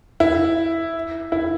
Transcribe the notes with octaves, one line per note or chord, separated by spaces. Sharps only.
E4
E4